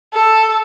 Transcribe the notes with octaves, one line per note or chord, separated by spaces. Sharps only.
A4